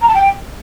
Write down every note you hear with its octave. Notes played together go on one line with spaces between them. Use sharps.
A#5
A5
G5